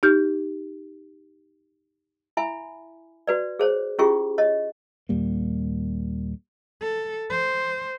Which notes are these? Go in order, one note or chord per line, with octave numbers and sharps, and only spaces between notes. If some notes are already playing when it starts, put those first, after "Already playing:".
D#4 G4 F6 G6
E4 E5 G#5 B5
F#4 B4 D5
G#4 C5 C#5
C#4 E4 F4 G4 G#4 C#6
C#5 D#5
D#2 A#2 G3 A#3
A4
C5